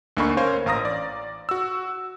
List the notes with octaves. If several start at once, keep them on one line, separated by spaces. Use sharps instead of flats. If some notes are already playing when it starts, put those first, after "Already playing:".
D2 D3 A#3 D#4 B5 C#6
C#4 A#4 C5 C#5 F5
A1 F5 A#5 D#6 A#6
D5
F#4 E6